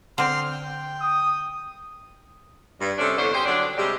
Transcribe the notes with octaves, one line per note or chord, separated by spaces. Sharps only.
D3 C4 C6 F6
G5
D#6
G2
C3 C#4 D4 A4
E2 D3 G3 C5 C#5
G4 G#4 C5
D3 F#3 D4
C3 G3 G#3 G4